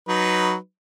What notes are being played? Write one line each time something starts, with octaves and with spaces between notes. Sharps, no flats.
F#3 D#4 B4